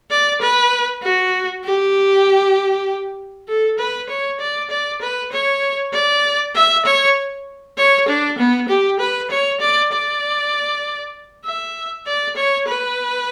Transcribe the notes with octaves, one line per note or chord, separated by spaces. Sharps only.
D5
B4
F#4
G4
A4
B4
C#5
D5
D5
B4
C#5
D5
E5
C#5
C#5
D4
B3
G4
B4
C#5
D5
D5
E5
D5
C#5
B4